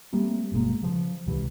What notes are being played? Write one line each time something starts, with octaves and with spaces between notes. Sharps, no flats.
G3 A3 A#3 C4
G1 B2 G#3 A#3
C#3 F3
C#2 C3 E3